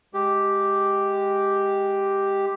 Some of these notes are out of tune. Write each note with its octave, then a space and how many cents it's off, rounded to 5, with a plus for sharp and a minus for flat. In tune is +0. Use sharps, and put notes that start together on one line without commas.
G#3 +0 G4 +0